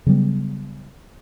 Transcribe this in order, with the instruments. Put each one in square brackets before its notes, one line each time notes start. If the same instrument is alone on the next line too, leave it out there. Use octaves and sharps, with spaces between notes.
[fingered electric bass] C#3 F#3 G3 B3